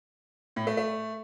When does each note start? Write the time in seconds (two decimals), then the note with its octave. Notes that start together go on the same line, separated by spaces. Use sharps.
0.56 A2
0.67 A3
0.77 A3